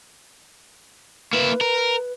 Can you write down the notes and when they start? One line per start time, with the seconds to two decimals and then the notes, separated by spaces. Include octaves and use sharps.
1.33 A#3 E4 B4
1.61 A#4